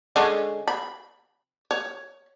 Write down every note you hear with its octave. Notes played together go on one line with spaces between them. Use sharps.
D3 G#3 C#4
B5
C#5